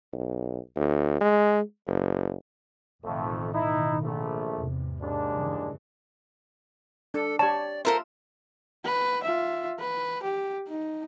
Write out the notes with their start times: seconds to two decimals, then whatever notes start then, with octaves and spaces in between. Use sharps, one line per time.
0.13 B1
0.76 D2
1.21 G#3
1.87 F#1
3.04 A1 F2 B2 D#3 A3
3.53 D#4 E4
4.03 A#1 A3
4.57 E2 G#2 C3
5.01 D#2 G#3 D4
5.33 G2 C#3 E3
7.14 D4 A4
7.39 G4 C#5 D5 A5
7.85 F4 A4 A#4 C5 E5
8.85 B4
9.23 F4 E5
9.79 B4
10.23 G4
10.68 D#4